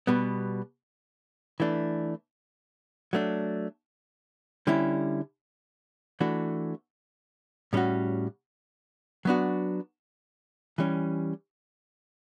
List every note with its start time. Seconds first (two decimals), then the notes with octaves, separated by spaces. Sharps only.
0.07 B2 G3 B3
1.60 E3 A3 D4
3.13 F#3 A3 D4
4.67 D3 G3 C#4 E4
6.20 E3 A3 D4 F#4
7.73 A2 G3 C#4 F#4
9.25 F#3 B3 D4 F#4
10.78 E3 G3 C#4